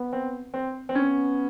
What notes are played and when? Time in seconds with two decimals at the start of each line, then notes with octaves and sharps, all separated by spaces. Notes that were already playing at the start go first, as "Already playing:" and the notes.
Already playing: B3
0.13 C4
0.54 C4
0.89 C4
0.95 B3 C#4